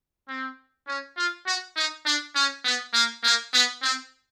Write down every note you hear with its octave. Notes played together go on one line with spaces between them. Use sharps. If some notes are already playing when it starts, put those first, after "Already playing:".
C4
C#4
F4
F#4
D#4
D4
C#4
B3
A#3
A#3
B3
C4